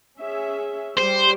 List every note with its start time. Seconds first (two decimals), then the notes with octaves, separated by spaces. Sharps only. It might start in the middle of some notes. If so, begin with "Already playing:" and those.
0.19 C#4 G#4 E5
0.97 G3 G4 C5